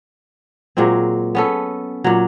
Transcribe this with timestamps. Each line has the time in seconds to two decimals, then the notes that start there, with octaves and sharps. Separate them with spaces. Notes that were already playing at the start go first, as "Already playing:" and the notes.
0.77 A#2 F#3 G#3 C4
1.35 B3 C#4 A4
2.04 A#2 F#3